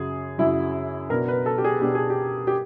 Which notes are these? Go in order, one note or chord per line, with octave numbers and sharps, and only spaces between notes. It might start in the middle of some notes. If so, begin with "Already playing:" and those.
Already playing: F#2 C#3 F#3 G#4
F#2 C#3 F#3 E4
B2 F#3 B3 D4 A#4
B4
A4
G4
G#4
B2 F#3 B3 D4 G4
G#4
G4
G4